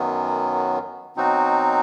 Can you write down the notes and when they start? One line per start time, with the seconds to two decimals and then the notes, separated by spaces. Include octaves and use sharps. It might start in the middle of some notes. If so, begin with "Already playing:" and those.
Already playing: F#2 D#3 F#3 B3
1.16 B2 F#3 C4 D#4 F#4